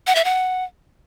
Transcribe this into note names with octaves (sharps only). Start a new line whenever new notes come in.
F#5
E5
F#5